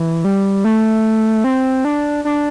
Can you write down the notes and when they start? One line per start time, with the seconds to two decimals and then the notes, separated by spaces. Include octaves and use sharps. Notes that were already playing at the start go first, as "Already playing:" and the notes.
Already playing: E3
0.24 G3
0.64 A3
1.44 C4
1.85 D4
2.25 D4